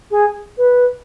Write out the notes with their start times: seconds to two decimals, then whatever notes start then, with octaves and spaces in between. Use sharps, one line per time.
0.11 G#4
0.58 B4